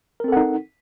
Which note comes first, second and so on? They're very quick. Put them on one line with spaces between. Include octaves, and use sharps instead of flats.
A#4 C4 A4 F#5 D#4